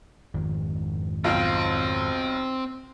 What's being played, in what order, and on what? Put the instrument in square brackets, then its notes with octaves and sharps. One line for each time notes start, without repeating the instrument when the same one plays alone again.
[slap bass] G#1 F2 D#3
[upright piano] B1 [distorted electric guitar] C4 [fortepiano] F4 G5 F6